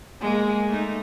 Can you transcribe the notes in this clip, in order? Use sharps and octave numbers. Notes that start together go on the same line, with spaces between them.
G#3 A#3
A3 D#4